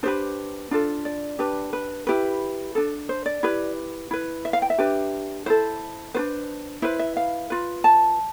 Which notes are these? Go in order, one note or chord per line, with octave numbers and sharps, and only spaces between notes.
D4 G4 B4 C5
D4 F4 A4
D5
D4 G4 B4
B4
E4 G4 B4
D4 A4
C5
D5
E4 G4 B4
E4 B4
E5
F5
G5
E5
D4 G4 B4
E4 A4 C5
D4 F4 B4 C5
E4 B4 C5
E5
F5
F4 B4
A5